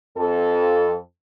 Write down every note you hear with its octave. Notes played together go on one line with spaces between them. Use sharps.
F2 A4